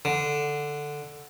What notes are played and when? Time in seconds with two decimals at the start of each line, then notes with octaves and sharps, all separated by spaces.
0.05 D3